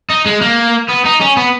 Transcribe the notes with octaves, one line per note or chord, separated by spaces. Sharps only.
D#4
G#3
A#3
B3
D#4
C#4
B3